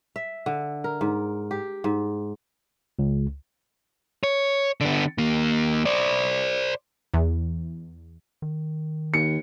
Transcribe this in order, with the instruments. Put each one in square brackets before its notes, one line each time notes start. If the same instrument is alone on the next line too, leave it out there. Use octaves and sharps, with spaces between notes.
[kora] E5
D3
A#4
G#2
G4
G#2
[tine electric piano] C#2
[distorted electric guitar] C#5
D3 B3
D#2 A#3
C5 D5
[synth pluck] E2
[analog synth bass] D#3
[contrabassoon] D#2 [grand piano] C#7